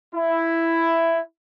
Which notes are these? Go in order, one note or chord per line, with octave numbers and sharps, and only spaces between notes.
E4